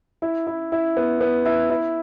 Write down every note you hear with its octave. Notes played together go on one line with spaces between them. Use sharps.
E4
E4
E4
B3
B3
E4
E4